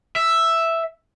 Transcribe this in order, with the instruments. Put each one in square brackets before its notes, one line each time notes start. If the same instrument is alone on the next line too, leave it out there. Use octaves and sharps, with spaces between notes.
[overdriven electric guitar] E5